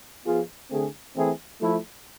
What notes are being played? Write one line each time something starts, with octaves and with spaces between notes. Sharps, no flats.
F3 B3 F4 G#4
D3 A3 C4 G#4
E3 A3 C4 E4 G#4
F3 A3 E4